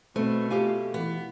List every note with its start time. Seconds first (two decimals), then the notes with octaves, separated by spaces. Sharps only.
0.16 B2 A3 C4 B4
0.50 F4 G4 F5 G#5
0.94 E3 B3